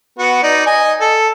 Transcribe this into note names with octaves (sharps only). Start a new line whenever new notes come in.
B3 F#4
D#4 D5
D#5 G#5
A4